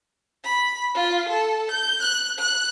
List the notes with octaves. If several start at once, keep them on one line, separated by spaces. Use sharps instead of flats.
B5
F4
A4
G6
F#6
F#6